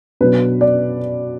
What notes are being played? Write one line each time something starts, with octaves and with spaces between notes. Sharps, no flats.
B2 F#3 D4 B4
D5